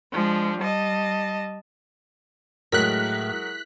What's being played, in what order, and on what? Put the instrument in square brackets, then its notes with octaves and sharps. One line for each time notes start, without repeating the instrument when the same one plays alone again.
[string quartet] F3 G#3 D4
G3 D#5 A5
[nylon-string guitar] A2 [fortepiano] F#3 G#3 A#4 [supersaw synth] F#6 B6